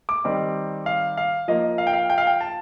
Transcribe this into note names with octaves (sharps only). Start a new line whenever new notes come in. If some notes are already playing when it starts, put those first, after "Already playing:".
D6
D#3 G3 C4 D#4
F5
F5
F3 A#3 D#4 D#5
F5
G5
F5
G5
F5
G5
A5